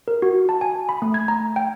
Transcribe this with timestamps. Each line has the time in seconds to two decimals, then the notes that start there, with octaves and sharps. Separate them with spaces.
0.08 A#4
0.22 F#4
0.49 A5
0.61 G#5
0.89 B5
1.02 A3
1.14 G#6
1.28 A#5
1.56 G5